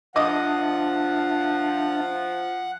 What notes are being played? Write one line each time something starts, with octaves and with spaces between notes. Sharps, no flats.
F3 D4 D#5 E5 F#5 A5 D6 D#6